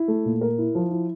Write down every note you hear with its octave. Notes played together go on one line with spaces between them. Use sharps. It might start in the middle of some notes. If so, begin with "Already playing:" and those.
Already playing: E4
A3
A#2
A#4
E4
F3
E4